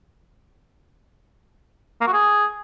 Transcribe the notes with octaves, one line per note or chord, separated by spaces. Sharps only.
A#3
F#4
G#4